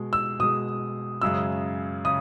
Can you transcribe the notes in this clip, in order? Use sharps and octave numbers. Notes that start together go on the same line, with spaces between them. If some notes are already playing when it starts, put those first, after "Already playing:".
Already playing: B2 G#3
E6
B2 G#3 D#6
F#2 C#3 G#3 E6
C#3 D#6